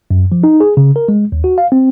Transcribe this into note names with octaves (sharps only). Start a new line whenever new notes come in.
F#2
F3
D#4
G#4
C#3
A#4
G#3
D#2
F#4
F5
C4